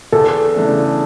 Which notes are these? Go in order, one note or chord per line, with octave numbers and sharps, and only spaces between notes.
E2 A4
C#3 E3 A3 D4